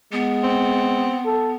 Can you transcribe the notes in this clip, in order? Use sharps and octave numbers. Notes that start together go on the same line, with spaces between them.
G#3 B3
C4
A4